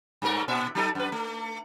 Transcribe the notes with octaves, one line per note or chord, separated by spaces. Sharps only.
G2 A3 A#4
A#2 E5
F#3 D#4 A4
F#2 B4
A3